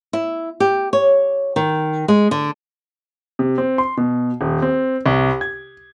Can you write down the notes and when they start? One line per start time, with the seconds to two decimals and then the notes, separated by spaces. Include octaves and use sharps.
0.13 E4
0.60 G4
0.93 C#5
1.56 D#3
2.08 G#3
2.31 D3
3.39 C3
3.58 C4
3.78 C6
3.97 B2
4.41 D#1
4.62 C4
5.06 C2
5.41 G#6